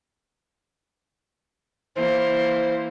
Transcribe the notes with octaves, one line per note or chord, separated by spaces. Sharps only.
E3 A#3 C5